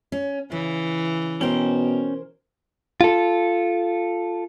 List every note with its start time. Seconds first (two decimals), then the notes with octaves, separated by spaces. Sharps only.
0.12 C#4
0.52 C#3 E3
1.41 B2 C#4 A#4 C5 G5
3.01 F4 A4